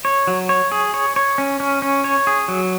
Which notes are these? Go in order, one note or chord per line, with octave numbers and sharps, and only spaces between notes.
C#5
F#3
C#5
G#4
C#5
C#5
C#4
C#4
C#4
C#5
G#4
F#3